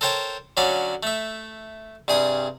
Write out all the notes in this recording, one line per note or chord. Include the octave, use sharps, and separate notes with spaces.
A4 A#4 C5 C#5 G5 A5
D3 F#3 C#4 D5 F5
A3 E5
C2 G2 G#4 D#6